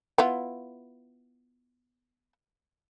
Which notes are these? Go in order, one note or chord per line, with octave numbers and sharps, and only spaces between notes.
B3 E4 F4